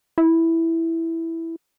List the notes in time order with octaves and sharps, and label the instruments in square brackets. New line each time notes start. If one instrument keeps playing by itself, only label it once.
[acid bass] E4